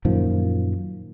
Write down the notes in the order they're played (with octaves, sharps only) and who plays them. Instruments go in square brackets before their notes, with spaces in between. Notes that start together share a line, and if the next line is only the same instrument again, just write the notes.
[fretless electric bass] F#2 A#2 D#3 F3